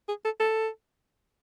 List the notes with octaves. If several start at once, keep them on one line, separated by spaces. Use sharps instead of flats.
G#4
A4
A4